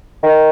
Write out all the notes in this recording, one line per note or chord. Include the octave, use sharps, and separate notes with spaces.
D#3